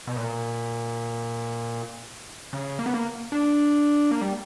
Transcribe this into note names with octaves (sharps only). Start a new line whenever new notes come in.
B2
A#2
C#3
A#3
B3
A#3
D4
A#3
G3